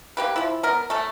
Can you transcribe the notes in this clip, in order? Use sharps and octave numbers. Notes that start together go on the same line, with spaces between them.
A#3 G4 B4
F3 E4
B3 A#4
A3 A4